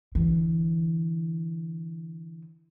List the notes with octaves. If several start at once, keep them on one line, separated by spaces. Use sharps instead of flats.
D3 E3